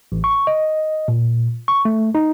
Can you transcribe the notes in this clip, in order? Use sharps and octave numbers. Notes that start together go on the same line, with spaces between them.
A1
C#6
D#5
A#2
C#6
A3
D#4